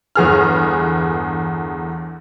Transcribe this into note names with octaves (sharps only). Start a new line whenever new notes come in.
G1 E2 G#4 F6